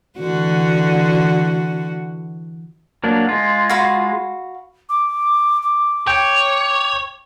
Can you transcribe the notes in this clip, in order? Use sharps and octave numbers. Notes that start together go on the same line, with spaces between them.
D3 E3 F#4
F#3 A#3 D4
G#3 F4
F#4 F5 B5
D6
D6
C#5 G5